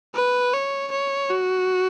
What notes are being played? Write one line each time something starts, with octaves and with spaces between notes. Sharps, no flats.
B4
C#5
C#5
F#4